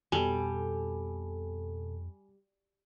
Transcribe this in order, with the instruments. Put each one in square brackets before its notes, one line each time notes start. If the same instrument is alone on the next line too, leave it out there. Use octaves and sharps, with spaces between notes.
[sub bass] F2 [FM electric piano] B2 A4 [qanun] G3 [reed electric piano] G#5